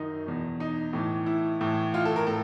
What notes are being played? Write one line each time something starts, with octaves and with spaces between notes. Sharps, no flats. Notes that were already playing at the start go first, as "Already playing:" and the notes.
Already playing: F#2 D#3 D#4
E2 B2
D#4
A2 E3
E4
A2 E3
F4
A4
A#4
A2 A4